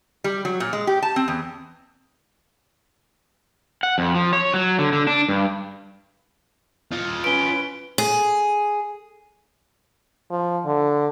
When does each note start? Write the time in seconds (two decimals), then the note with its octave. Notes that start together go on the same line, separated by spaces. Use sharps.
0.24 G3
0.45 F#3
0.60 A#2
0.73 G#3
0.87 G4
1.03 A5
1.16 C4
1.28 E2
3.83 F#5
3.98 F2
4.15 F3
4.33 C#5
4.54 F#3
4.79 D3
4.93 D3
5.07 D4
5.29 G2
6.91 F4 D#5
7.24 C#4 B4 D7 G7
7.98 G#4
10.31 F3
10.65 D3